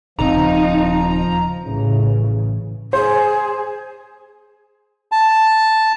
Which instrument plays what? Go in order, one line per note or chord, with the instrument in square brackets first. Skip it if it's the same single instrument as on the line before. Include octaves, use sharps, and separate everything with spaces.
[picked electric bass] D#1 C#3 C4 [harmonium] F3 [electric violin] D#4 [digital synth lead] A#5
[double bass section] A1 C#3 E3
[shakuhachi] G#4 [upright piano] C5
[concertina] A5